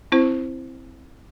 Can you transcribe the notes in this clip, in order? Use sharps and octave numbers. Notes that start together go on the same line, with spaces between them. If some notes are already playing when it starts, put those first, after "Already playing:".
C4 E4 C5